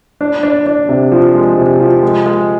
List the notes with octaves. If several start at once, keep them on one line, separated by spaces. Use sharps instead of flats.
D4
D4
D4
C3
F3
G#3
C3
F3
G#3
G#3